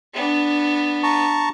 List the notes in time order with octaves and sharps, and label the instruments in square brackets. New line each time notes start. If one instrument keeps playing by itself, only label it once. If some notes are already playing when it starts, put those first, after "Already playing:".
[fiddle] B3 D4
[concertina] A5 A#5 C#6